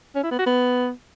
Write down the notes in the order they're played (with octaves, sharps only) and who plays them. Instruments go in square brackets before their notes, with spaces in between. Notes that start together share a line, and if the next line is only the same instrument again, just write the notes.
[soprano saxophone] C#4
E4
B3
F#4
B3